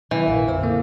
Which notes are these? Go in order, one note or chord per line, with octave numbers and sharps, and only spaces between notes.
B2 D#3 E3 F#3
A#1 G2 A#2 A#4 F5
F2 D3 E4 C5 E6
A#3 A4